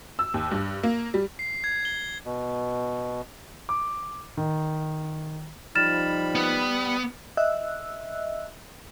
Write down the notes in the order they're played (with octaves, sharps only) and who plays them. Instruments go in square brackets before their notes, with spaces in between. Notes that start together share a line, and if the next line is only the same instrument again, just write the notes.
[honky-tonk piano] E6
D#2
G2
A#3
G3
[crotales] C7
G#6
G7
[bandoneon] B2
[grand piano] D6
D#3
[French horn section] F3 D#4 [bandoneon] G3 B5 [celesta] F6 A6 E7
[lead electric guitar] B3
[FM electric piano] D#5 E5 E6 F#6